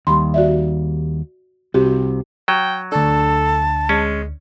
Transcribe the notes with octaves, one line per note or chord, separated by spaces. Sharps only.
D#2 G3 B5 C6
F#4 D5 E5
C2 C3 F#4 G4
F#3 G5
D2 D4 A4 A5
G#3 C#4